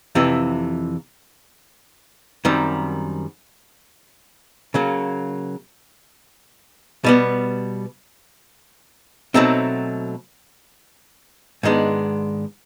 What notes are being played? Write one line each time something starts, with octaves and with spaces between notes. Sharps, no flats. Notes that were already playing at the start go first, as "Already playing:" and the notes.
F2 C3 E3
F#2 D#3 G3 C4
C#3 F#3 A#3
B2 G3 B3
B2 F#3 A3 C4 D#4
G#2 D#3 G#3 B3 D4